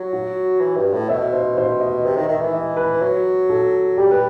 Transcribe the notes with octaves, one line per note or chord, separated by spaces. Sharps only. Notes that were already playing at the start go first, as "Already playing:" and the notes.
Already playing: F#3
F#4
E3
G2
A2
B2 E5
C5
C5
D#5
C3 E5
D#3
D#3 E5
E3
D#5
B4
F#3
A4
G3 G4
B4